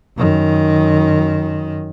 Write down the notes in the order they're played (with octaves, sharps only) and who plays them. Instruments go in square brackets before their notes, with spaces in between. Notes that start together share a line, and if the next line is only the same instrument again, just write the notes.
[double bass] F#2 D#3